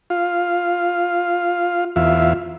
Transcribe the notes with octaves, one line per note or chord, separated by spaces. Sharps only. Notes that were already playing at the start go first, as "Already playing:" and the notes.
F4 F5
E2 F4 E5 F5